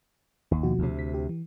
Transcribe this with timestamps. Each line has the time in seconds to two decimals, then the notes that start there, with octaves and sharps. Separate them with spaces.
0.51 G1 D#2
0.63 B2 F3 F#4
0.79 D2 C3
0.99 B6
1.14 G4
1.29 E3